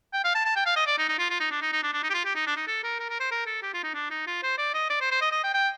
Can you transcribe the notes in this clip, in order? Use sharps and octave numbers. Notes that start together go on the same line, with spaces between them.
G5
F5
A5
A5
G5
F5
D#5
D5
D#4
D#4
F4
F4
D#4
D4
D#4
D#4
D4
D4
D#4
G4
F4
G4
D#4
D4
D#4
A4
A#4
A#4
A#4
C5
A#4
A4
G4
F4
D#4
D4
D#4
F4
C5
D5
D#5
D5
C5
C5
D#5
D#5
G5
G5